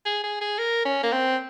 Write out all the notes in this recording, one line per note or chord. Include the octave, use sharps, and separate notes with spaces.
G#4
G#4
G#4
A#4
C#4
A#3
C4